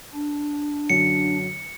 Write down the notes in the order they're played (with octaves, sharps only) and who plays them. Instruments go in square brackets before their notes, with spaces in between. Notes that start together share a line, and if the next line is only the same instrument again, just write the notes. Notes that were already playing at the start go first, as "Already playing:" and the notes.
[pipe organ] D4
[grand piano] F#2 D3 F#3 [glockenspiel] C#7